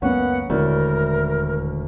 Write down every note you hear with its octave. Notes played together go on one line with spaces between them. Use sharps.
C#2 F#2 A#3 B3 C#4 F#5
D#1 D2 G#3 C#4 E4 A#4